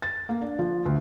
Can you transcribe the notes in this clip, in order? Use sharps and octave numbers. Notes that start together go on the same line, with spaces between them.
A6
A#3
D4
F3
D2